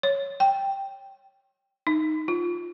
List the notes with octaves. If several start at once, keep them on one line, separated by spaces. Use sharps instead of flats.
C#5
G5
D#4
F4